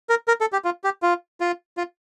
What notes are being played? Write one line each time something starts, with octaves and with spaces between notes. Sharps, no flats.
A#4
A#4
A4
G4
F4
G4
F4
F4
F4